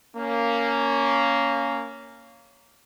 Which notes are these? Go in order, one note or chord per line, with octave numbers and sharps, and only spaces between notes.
A#3 C#4